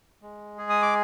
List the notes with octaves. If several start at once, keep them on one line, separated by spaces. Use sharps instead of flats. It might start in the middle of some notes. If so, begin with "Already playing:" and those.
G#3
G#4
D#6
D6